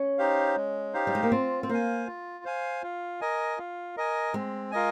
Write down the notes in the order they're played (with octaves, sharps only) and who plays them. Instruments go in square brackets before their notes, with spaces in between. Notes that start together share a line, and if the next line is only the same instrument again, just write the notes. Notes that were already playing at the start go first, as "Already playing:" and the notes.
Already playing: [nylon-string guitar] C#4
[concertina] D#4 G4 C5 F5
G#3
D#4 G4 C5 F5
[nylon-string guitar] G3
G#3
A#3
[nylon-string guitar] C4 [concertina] F4
[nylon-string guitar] C4
[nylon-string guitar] A#3 [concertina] C5 F5 G#5
[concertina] F4
C5 F5 G#5
F4
A#4 D#5 G#5
F4
A#4 D#5 G#5
[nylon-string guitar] G#3 [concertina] C4
[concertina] F4 A#4 D#5 G#5